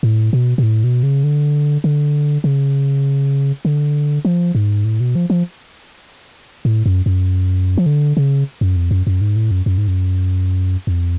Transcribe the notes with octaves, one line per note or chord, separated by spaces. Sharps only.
A2
B2
B2
A2
B2
C#3
D3
D3
C#3
D3
F3
G#2
A2
B2
F3
F3
A2
F#2
F#2
F3
D3
C#3
F#2
F2
F#2
F#2
G#2
A2
F#2
F#2
G#2
F#2
F2